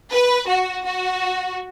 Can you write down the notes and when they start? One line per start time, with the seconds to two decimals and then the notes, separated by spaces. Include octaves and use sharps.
0.11 B4
0.49 F#4
0.86 F#4